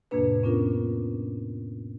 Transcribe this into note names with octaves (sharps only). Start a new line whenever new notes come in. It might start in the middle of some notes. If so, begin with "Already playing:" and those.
F2 A2 C3 A#3 D4 B4
B3 C#4 D4 F4 A#4